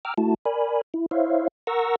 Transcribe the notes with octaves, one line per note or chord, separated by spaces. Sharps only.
G5 A#5 D6 E6 F6
A3 E4 F#4 A5
A#4 D5 G#5 B5
E4
E4 C5 C#5 E5 F5
A#4 F#5 A#5 C#6 E6 A#6